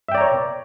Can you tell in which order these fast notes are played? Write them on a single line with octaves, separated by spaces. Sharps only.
E5 G5 D5 A#5 C#5